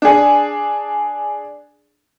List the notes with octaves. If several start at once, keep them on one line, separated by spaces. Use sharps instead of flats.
D4 G#4